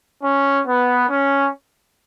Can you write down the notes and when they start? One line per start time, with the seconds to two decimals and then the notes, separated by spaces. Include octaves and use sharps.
0.23 C#4
0.67 B3
1.10 C#4